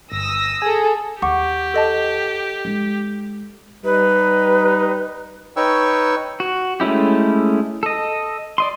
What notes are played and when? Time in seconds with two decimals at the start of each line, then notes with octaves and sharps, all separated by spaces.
0.12 G1 D#6 E6 A#6
0.62 G#4 A4 G#5
1.22 D#2 G4 F#5 C#6 D6
1.74 A4 D#5 A5
2.65 G#3 D#4
3.84 G3 D#4 B4
5.56 D#4 B4 C#5 G5 C#6 E6
6.40 F#4
6.80 G#3 A3 C#4 E4 G4
7.83 A4 D#5
8.58 D5 D#5 C6